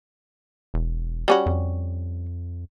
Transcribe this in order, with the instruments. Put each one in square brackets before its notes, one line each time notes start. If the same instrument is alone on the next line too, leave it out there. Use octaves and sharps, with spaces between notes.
[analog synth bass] E1
[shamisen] G3 C#4 F#4
[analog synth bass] F2